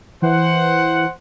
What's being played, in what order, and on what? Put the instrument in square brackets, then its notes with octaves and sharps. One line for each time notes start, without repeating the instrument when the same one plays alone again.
[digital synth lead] E3 [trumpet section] C5 F#5